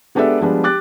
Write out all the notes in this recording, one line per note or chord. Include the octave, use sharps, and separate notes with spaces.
G#3 B3 D4 G4 A4 E5
F3 G3 G#3 B3 D4
G4 D6 F#6 A6